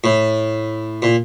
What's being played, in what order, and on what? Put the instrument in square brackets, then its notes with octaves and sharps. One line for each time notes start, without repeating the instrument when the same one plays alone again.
[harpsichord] A2
A#2